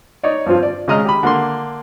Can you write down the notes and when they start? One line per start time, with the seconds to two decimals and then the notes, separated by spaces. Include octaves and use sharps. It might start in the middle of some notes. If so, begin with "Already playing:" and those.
0.23 D#4 C#5 D5
0.46 G2 F3 C4 F4
0.63 D5
0.88 C#3 G#3 D#5 A#5 F6
1.05 G4 B5
1.23 D3 A#3 C6